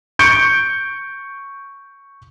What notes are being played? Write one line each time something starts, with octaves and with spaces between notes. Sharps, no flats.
C#6 G6 C#7 D7